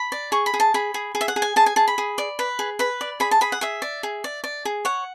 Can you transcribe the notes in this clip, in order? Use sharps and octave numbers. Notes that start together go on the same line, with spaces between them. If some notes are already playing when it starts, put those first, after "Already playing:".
Already playing: B5
D5
G#4 C#6
B5
G#4
A5
G#4 B5
G#4
G#4
E5
F#5
G#4
G#5
G#4 A5
G#5
G#4 A5
B5
G#4
D5
B4
G#4
B4 B5
D5
G#4 B5
A5
G#4 B5
F#5
G#4 E5
D5
G#4
D5
D5
G#4
C#5 F#5